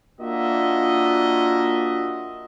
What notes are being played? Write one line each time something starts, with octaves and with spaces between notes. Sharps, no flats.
A#3 D4 F4 F#4 D#5 E5